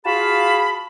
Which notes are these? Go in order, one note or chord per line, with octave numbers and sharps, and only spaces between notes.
F4 F#4 G#4 F5 A5 B5